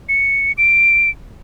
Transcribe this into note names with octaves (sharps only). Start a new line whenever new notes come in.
C#7
D7